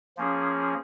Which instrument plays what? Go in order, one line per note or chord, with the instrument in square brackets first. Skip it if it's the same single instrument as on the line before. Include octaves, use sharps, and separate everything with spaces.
[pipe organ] F3 A#3 C#4 G#4